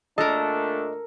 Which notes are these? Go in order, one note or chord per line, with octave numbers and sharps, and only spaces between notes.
A#2 A3 D4 A4 A#4 D#5